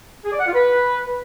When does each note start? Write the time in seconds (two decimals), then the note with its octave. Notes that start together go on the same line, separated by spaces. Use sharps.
0.25 G#4
0.32 D5
0.39 F#5
0.47 F4
0.54 B4